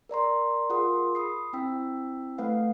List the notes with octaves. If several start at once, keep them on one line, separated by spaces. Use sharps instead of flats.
A#4 D5 A#5 C6
F4 G#4 A#4 F#5 C6 D#6
B5 D#6 C7
C4 E4 G5 E6 B6
A3 B4 F5 F#5